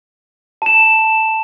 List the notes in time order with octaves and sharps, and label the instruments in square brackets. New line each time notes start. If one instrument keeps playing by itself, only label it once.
[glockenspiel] A5 E7